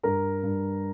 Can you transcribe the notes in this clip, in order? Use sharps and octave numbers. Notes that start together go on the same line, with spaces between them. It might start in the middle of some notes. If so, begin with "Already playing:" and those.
G2 A#4 A#5
G2